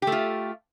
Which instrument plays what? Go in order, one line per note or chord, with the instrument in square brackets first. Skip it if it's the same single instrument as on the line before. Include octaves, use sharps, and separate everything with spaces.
[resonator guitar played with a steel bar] G4
A3
F4